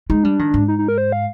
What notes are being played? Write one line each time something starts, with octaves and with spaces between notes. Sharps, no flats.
G#3 D#4
G3 D4
D#3
G#2
D#4
D#4
A#4
C5
F5